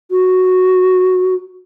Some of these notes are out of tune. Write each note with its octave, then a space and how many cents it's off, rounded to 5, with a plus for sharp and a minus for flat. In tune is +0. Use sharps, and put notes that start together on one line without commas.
F#4 -5